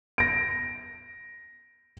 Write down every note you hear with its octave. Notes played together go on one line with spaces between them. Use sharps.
A#6 D7